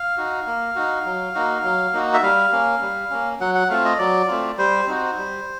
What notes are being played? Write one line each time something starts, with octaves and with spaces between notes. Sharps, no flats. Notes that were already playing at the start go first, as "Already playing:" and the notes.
Already playing: F5
D#4 F#4
A#3
D#4 F#4
F#3
A#3 D#4 F#4
F#3
A#3 D#4 F#4
E5
G3 F5
A#3 C#4
G3
A#3 C#4
F#3 F#5
F#5
A3 C4 F4 F5
D#5
F#3 D5
A3 C4 F4
G3 C5
C4 D#4 F#4
G3